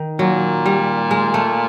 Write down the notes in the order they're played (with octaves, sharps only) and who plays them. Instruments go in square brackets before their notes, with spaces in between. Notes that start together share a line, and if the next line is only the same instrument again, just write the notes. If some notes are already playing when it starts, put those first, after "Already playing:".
Already playing: [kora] D#3
[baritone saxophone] A#2 [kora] F#3
[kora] G3
G#3
A3